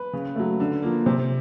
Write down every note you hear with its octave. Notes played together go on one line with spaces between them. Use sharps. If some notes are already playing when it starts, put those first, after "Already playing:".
Already playing: B4
C#3
F#3 A3
D3
F3 A#3
C3 C5